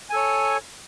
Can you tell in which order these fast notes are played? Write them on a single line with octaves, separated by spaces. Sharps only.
G#5 A4 C#5